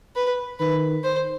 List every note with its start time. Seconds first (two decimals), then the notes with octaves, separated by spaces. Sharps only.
0.16 B4
0.60 D#3 B4
1.03 C5